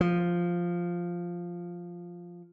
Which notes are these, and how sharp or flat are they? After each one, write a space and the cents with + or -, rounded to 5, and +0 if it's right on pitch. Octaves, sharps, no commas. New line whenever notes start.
F3 +0